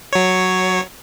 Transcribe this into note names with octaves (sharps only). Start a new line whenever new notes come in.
F#3 C#5